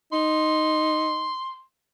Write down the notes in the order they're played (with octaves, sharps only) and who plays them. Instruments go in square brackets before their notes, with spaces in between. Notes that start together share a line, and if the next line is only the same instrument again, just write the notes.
[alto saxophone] D#4 [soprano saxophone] C6